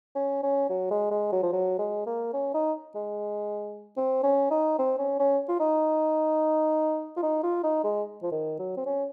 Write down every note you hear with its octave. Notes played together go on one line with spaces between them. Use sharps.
C#4
C#4
F#3
G#3
G#3
F#3
F3
F#3
G#3
A#3
C#4
D#4
G#3
C4
C#4
D#4
C4
C#4
C#4
F4
D#4
F4
D#4
F4
D#4
G#3
F3
D#3
F#3
C4
C#4